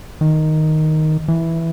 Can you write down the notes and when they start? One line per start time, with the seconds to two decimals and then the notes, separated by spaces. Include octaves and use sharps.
0.21 D#3
1.28 E3